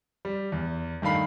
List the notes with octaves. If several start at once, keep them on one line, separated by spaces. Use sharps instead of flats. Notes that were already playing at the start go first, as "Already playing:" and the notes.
G3
E2
G2 D#3 A3 F5 B5 C7